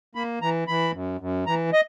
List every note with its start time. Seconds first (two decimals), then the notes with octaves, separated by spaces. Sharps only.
0.15 A#3 B5
0.42 E3 A#5
0.67 E3 B5
0.94 F#2
1.21 F#2
1.47 E3 A#5
1.73 D#5